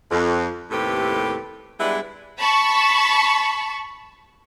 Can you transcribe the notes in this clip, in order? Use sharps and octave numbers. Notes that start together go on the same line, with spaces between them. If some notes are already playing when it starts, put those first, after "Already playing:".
F2
D#2 A2 C3 G4 A4 B4
G3 G#3 B3 D4 E4
A5 B5 C#6